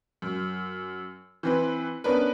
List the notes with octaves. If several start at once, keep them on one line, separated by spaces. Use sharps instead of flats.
F#2
E3 C4 B4
B3 C#4 D4 A#4 B4